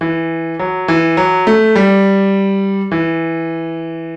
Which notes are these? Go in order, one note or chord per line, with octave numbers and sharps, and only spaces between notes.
E3
F#3
E3
F#3
A3
G3
E3